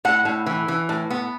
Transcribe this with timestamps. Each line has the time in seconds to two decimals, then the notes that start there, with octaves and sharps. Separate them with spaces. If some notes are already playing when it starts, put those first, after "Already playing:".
0.05 A2 F#5
0.25 A2
0.46 E3
0.68 E3
0.89 A2
1.10 B3